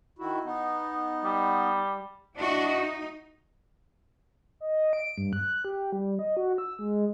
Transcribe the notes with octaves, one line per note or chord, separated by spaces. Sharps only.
D#3 E4 F#4
B3 D#4
G3
D4 E4 F#4 D#5
D#4
D#5
D7
G2
F#6
G4
G3
D#5
F#4
E6
G#3